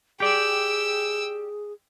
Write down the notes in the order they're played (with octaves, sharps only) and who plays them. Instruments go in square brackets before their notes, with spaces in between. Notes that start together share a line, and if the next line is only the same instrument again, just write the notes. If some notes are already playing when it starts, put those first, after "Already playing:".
[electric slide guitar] G4 D5 [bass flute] G#4 [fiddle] G5 E6